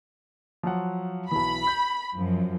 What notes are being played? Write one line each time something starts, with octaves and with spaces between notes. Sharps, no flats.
F3 F#3 F#5
B1 E3 B5
G6
F#2 F3